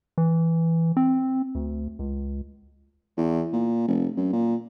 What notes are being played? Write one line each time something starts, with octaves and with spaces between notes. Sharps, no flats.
E3
C4
D2
C#2
E2
A#2
F1
F#2
A#2